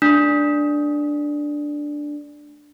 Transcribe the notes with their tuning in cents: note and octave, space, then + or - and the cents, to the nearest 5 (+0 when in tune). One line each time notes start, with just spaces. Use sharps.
A3 +0 D4 +0